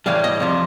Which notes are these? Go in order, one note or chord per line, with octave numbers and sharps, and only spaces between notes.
A2 E3 G3 F5
D#5
F2 C3 F3